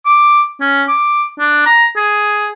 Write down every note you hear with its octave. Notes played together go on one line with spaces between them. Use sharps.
D6
C#4
D6
D4
A#5
G#4